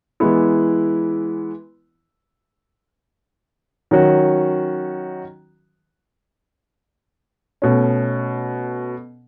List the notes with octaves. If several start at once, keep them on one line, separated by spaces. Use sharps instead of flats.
E3 G#3 B3 E4
D#3 F#3 C#4 F#4
B2 A3 C#4